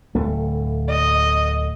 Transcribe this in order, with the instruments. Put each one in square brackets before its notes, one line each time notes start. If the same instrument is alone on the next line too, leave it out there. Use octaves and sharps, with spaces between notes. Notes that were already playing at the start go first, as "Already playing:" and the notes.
[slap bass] D1 A3
[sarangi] D#5